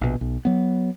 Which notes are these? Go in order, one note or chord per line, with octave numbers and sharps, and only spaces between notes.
A#1 B2
B1
F#3 B3